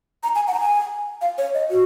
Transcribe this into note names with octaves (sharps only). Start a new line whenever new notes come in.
A#5
G#5
F#5
A#5
G#5
F5
C#5
D#5
F#4